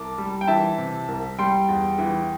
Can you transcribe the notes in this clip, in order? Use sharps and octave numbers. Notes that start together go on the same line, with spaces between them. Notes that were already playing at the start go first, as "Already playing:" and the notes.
Already playing: C2 A5 D6
G3
G5
E3 E5 A5
C3
C2
G3 G5 C6
E2
E3